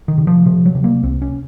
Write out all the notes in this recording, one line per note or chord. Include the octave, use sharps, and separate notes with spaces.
D#3
C3
F3
C3 F3
F#3
C3
A#3
C2 C4
C#4